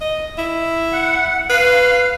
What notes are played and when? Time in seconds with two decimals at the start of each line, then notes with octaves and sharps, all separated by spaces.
0.01 D#5
0.38 E4
0.93 F#5
1.50 B4 F5